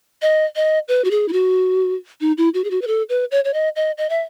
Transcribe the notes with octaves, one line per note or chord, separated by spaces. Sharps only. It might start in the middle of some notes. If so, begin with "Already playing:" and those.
D#5
D#5
B4
F#4
G#4
E4
F#4
D#4
E4
F#4
G#4
F#4
B4
A4
B4
C#5
C#5
D#5
D#5
D#5
E5